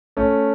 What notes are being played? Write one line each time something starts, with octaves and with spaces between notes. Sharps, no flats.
A3 C#4